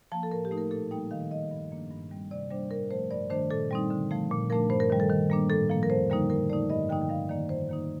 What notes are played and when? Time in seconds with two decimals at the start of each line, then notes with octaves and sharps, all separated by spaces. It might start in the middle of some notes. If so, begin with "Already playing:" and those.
0.12 F3 A#3 A5
0.23 A4
0.31 A2 A#4
0.45 G4
0.51 A3 D#4
0.58 A#4
0.71 A#2 A4
0.91 G3 A#3 D#4 G5
1.11 D#3 F5
1.23 F5
1.31 G3 A#3 D#5
1.51 G2
1.71 F3 A#3 D4
1.91 G2
2.10 D#3 G3 C4
2.31 C3 D5
2.50 G3 A#3 D4 C5
2.71 A2 A#4
2.91 F3 A3 C5
3.11 G2 D5
3.30 D#3 A3 D4 C5
3.51 A#2 A4
3.71 G3 C4 D#4
3.90 D3
4.11 F3 A3
4.31 A#2
4.50 F3 A3 D4 A#4
4.70 G2 C5
4.80 A#4
4.90 D#3 G3
5.00 A4
5.10 D#3
5.30 G3 A#3 D4
5.50 A2 A4
5.70 F3 A#3
5.83 A#4
5.89 F2 C5
6.10 D3 G3 A#3 D#4
6.30 A2 A#4
6.50 A3 D#4 D5
6.70 G2 D#5
6.89 D3 F3 A#3 D#4 G5
7.02 G5
7.09 G2 F5
7.29 D#3 A#3 D#4 D5
7.49 F2 C5
7.69 D#3 A#3 D#4